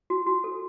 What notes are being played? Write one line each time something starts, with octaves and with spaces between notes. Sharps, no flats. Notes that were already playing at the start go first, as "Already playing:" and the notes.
F#4
F#4
A4